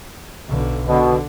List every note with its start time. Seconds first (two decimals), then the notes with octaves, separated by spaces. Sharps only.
0.49 B1 D3
0.87 B2 D3